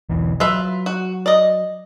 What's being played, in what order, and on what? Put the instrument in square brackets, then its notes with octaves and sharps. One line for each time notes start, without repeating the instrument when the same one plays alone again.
[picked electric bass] B1 E2 E3
[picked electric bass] F#3 [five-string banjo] F4 B4 E5
[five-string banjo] F#4
D5 D#5